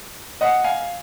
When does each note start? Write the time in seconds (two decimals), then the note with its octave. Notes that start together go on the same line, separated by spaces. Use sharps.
0.41 D#5 F#5
0.64 F5 G#5